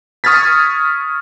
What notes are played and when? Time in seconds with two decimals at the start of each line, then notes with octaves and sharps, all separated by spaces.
0.24 C#6 D#6 F6 G#6 A6 B6